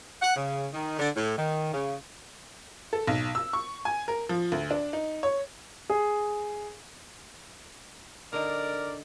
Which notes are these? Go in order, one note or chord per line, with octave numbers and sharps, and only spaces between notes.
F#5
C#3
D#3
D3
A2
D#3
C#3
A4
B1
E6
C#6
G#5
A#4
F3
D2
D4
D#4
C#5
G#4
D3 D#4 A#4 D5